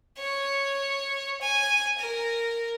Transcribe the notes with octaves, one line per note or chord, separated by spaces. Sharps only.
C#5
G#5
A#4